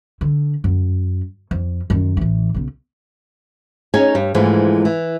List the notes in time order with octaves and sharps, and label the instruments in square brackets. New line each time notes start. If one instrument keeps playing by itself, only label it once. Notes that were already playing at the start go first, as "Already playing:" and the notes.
[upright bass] D3
F#2
F2
F#2 D#3
A1 E3
B1 C#3
[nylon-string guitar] C#4 D#4 G#4 C#5 G#5
G2 G3
G#2 D3 E3 F3 G#3 A3
E3